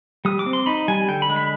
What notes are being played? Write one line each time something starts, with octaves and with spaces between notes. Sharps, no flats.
G3 D#6
D6
C4
C6
D#4 B5
G3 G#5
D3 G5
B5
G#3
B5